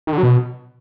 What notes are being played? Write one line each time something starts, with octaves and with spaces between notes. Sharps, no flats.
D#3
D3
F#3
B2